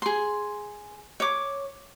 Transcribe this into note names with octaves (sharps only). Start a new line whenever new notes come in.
G#4 C6
C#5 D6